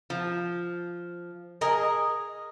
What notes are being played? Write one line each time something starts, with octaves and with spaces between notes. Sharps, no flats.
F3
G#4 A#4 D#5